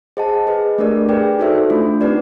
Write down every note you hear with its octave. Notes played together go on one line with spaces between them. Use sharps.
G#4 C5 D#5 F#5 A5
G#4 B4 D#5
A3 D4 G4 A#4 D5
G#4 B4 D5 G5
D#4 F#4 A4 C5 E5
A3 D4 F4
C4 D#4 G4 B4 D5